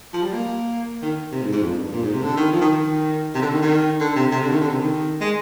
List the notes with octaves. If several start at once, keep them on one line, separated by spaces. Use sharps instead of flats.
F3
G3
A#3
D#3
C3
G#2
G#2
F2
G2
A#2
G#2
C3
D3
D#3
F3
D#3
D#3
C3
D3
D#3
D#3
D3
C3
C3
D3
D#3
D3
C3
D#3
G#3